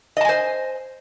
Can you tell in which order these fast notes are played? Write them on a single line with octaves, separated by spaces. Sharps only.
D#5 A5 G#5 C5